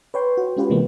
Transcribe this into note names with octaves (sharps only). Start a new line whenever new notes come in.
B4 C#5 G5 C6
F#4
G#3 C#4 F4 G4 B4
C3 E3 G#3 A#3 B3